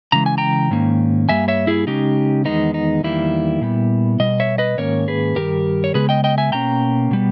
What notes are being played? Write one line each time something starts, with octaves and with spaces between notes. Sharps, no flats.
C#3 E3 G#3 A#5
G#5
G5 A#5
G#2 D#3 A#3 C#4
G2 G3 A#3 E5 G#5
C#5 E5
E4 G#4
C#3 G#3 C#4 D#4 G4
E2 D#3 G#3 B3 D#4
D#4
E2 D#3 G3 A#3 E4
A#2 G3 B3
B2 G3 D#5
C#5 E5
B4 D#5
G#2 D#3 A#3 C#4 A#4 C#5
G#4 B4
G2 D#3 G3 G4 A#4
C#5
C#3 G#3 B3 G#4 B4
D#5 G5
D#5 G5
E5 G#5
B2 A#3 C#4 G5 A#5
B2 G3 B3